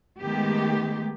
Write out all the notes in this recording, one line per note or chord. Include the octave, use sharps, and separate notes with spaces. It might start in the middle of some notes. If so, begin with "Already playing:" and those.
D#3 G#3 A3 B3 G4